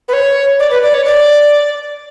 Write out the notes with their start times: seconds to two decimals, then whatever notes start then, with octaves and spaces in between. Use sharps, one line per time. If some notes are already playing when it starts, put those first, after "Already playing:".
0.08 B4
0.13 C#5
0.60 D5
0.71 B4
0.82 D5
0.94 C#5
1.05 D5